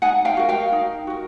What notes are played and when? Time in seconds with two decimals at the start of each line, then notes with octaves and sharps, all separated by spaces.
0.02 D#4 F#5 G#5
0.25 F5 G5
0.37 F#4 A#4
0.49 F5 G5
0.72 D#4
1.07 F#4 A#4